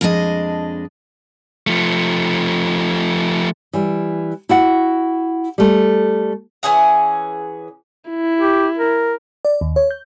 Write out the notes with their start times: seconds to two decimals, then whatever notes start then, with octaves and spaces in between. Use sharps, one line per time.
0.01 F2 G#3 D4 G4 D#5
1.67 F3 A3
3.73 E3 G3
4.49 E4 F#4 F#5
5.58 G3 A3
6.63 E3 C#4 G#4 F#5
8.10 E4
8.40 G4
8.78 A#4
9.45 D5
9.61 D#2
9.76 C#5
9.91 G6